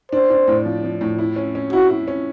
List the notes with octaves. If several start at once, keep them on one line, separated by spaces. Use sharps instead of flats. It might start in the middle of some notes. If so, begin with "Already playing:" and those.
D4 C5
D4
A2
F3
F3
A2
E4
C#4
C#4
E4 F#4
E4
C#4